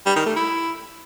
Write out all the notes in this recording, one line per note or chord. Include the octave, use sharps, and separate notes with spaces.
G3
D#3
A3
E4